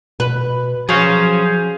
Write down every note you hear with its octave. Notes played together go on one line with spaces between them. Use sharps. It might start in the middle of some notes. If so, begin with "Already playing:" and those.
B2 B4
F3 F#3 C#4 G#4 C5 F5